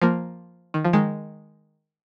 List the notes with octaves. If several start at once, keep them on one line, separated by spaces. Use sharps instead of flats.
F3 A#3
D#3
F3
D#3 G#3